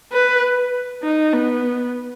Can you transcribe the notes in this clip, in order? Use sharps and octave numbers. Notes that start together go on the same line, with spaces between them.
B4
D#4
B3